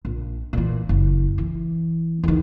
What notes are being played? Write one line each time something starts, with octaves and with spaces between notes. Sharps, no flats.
A#1
A#2 E3
F#1
E3
E2 D#3